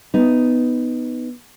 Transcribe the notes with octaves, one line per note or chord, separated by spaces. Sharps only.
B3 D#4